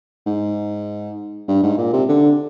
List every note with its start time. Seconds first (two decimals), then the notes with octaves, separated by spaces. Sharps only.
0.27 G#2
1.48 G2
1.63 G#2
1.78 A#2
1.93 C3
2.09 D3